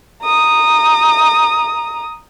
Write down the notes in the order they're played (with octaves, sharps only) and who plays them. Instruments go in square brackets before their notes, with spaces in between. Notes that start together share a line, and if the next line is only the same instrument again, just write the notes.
[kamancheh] A#5 D#6